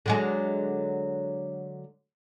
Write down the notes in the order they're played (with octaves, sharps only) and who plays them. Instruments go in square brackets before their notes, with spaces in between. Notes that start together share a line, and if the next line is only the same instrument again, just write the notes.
[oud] D3 F#3 G#3